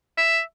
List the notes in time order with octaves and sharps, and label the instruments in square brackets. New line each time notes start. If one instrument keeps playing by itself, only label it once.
[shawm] E5